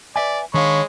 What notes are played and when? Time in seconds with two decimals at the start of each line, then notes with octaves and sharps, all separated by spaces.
0.16 B4 D5 E5 G#5
0.54 D#3 G#3 D4 C#5 F5 B5 C#6